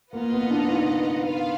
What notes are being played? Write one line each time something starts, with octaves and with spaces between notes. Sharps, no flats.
A#3 F4 B4 D#5 F#5
B3
D4
D#4
B3 F4 B4 F5